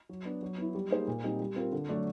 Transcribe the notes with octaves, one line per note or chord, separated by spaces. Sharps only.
F#3
B3 D4
F#3
B3 E4
G3
A#3 D#4 G#4 C5
A#2
G3 C4 D#4
G3
C4 F4 A#4
D3
F#3 A3 D4